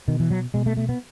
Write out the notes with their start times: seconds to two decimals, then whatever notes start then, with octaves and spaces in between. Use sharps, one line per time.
0.08 B2 D#3
0.20 E3
0.30 F#3
0.54 B2 G#3
0.66 A3
0.77 A3
0.89 B3